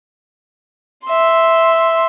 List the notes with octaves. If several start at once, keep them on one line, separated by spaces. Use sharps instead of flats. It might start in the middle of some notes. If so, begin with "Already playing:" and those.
E5 C6